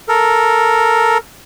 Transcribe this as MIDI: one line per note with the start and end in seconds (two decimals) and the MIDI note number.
0.09 1.18 69
0.09 1.18 70